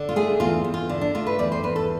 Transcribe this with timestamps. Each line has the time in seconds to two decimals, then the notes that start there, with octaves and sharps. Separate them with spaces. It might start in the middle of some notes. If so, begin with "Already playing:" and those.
Already playing: D3
0.09 F4
0.16 A3 G#4
0.40 E2 F4
0.64 E2
0.74 F4
0.89 D3
1.01 D4
1.15 A3 F4
1.27 B4
1.39 E2 D5
1.52 C5
1.63 E2 B4
1.76 A4